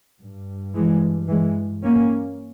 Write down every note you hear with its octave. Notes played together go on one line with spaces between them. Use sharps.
G2
E3 G#3
E3 G#3
A#3 C#4